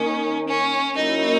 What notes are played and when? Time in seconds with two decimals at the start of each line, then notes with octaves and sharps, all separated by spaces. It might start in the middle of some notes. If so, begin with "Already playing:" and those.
Already playing: D#3 A#3 C#4 D#4
0.48 C#4
0.96 F#3 A#3 C#4 D#4 E4 A#4